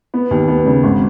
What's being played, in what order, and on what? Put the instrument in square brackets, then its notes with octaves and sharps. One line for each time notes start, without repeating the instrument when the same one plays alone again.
[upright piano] B3
D#2
B3
C#3
G#1